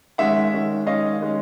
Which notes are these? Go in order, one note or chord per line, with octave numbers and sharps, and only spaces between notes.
D#3 G#3 C#4 E5 F#5
D#3 G#3 C#4
D#3 G#3 C#4 D#5 F5
D#3 G#3 C#4